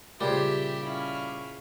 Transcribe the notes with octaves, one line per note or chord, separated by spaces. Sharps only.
A#2 C#3 G3 G4 C5 E5
C#4 E4 F5